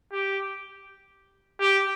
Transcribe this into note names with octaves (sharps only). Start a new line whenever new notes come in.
G4
G4